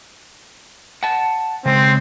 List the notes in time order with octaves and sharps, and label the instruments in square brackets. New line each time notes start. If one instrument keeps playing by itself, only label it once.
[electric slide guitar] F#5 A5
[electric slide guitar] C#3 G#3 [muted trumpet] C4